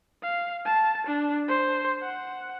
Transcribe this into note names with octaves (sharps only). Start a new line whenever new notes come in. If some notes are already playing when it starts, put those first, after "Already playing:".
F5
A5
D4
C5
F#5